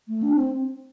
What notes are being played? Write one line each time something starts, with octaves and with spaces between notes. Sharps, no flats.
A3
D4
C4